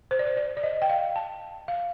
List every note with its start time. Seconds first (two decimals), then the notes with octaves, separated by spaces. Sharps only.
0.11 C5
0.19 D5
0.27 C5
0.37 D5
0.57 D5
0.63 D#5
0.82 G5
0.89 F5
1.16 A5
1.68 F5